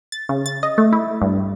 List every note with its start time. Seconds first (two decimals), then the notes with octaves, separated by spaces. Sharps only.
0.12 A6
0.29 C#3
0.46 A6
0.63 D#5
0.78 A3
0.92 E4
1.22 G2